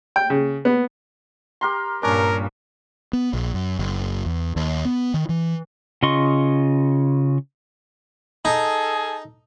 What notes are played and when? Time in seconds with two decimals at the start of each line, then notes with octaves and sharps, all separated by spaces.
0.16 G5
0.30 C#3
0.65 B3
1.61 G4 A#4 C6
2.03 G2 A#2 G3 C#4 D4 A#4
3.13 B3
3.33 A#1
3.54 F#2
3.79 F#1
4.26 E2
4.56 D#2
4.85 B3
5.14 D#3
5.29 E3
6.03 C#3 F4 D#5 C6 C#6
8.45 D#4 G#4 A4